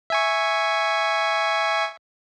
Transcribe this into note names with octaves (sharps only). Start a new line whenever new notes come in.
E5 G#5 C#6